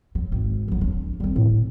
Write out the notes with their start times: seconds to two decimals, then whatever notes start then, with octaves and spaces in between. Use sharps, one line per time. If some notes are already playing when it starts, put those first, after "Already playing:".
0.15 F#3
0.32 G#1
0.68 E3 F#3
0.81 D4
1.20 G3 C4
1.36 A2